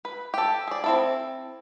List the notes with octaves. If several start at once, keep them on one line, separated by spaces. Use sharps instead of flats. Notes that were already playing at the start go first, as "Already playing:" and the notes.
B4
G4 A4
G#4 D5
C4 E4 A4